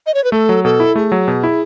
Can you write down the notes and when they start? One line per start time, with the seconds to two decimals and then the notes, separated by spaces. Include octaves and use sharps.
0.06 D#5
0.14 C#5
0.24 B4
0.32 A3 A4
0.49 F#3
0.64 B2 A4
0.80 E4
0.96 A3 G#4
1.12 F#3
1.28 B2
1.43 E4